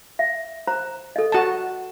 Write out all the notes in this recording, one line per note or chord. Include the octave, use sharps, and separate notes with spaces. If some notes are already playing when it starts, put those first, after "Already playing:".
E5
C5 A#5
A4 D#5
F#4 A5